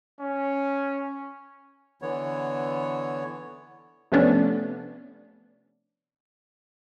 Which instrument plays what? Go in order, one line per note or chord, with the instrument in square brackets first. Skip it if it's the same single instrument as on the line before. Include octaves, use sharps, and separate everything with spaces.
[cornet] C#4
[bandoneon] D3 E3 B3 C#5
[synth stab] C3 F3 A3 B3 C#4 D4